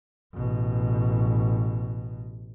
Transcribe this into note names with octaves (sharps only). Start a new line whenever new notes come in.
A1 B2